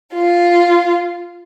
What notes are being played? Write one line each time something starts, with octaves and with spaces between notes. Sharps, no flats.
F4